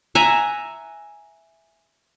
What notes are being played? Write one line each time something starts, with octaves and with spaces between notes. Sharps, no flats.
E5 F#5 G#5 A#5